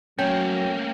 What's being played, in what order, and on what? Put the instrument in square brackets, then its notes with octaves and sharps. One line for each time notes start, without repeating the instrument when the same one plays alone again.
[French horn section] F#3 [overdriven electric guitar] A3 A#3 [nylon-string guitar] C#4 [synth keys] G5